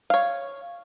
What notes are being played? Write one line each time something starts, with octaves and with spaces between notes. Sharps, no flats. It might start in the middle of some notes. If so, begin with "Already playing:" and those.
C#5 F5